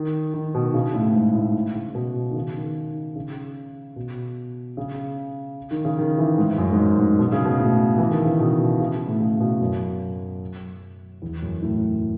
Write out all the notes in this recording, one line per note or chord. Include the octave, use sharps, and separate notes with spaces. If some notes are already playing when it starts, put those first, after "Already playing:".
Already playing: D#3
D#3
B2
C#3
A2
G#2
A2
C#3
B2
D#3
C#3
D#3
C#3
B2
C#3
D#3
C#3
D#3
E3
G#2
F#2
G#2
F#2
G#2
B2
C#3
B2
A2
E3
D#3
C#3
B2
C#3
A2
C#3
B2
F#2
E2
F#2
A2